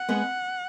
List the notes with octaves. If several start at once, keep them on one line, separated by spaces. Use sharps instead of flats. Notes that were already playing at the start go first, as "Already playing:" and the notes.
Already playing: F#5
G#3 B3